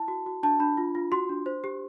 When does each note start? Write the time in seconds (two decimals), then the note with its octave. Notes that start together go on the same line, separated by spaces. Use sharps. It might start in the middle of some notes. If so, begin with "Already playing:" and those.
Already playing: E4 A5
0.08 F#4
0.26 F#4
0.43 D4 A5
0.60 D4 B5
0.77 F4
0.95 F4
1.12 F#4 C6
1.29 D4
1.46 C5
1.64 G4